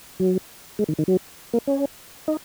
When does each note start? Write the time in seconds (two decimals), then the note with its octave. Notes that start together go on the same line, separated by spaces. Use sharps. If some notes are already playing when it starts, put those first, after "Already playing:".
0.20 F#3
0.79 G#3
0.88 D#3
0.99 D#3
1.08 F#3
1.53 A#3
1.68 C#4
2.28 D#4